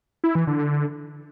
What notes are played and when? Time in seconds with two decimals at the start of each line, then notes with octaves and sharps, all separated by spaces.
0.24 E4
0.35 E3
0.47 D3
0.59 D3